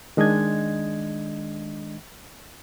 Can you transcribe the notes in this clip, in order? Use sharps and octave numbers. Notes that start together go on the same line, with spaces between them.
D#3 G#3 D4 D#5 G#6